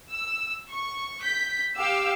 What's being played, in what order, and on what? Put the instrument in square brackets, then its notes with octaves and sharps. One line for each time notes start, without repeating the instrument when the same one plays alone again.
[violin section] E6
C#6
G6 B6
G4 F5 E6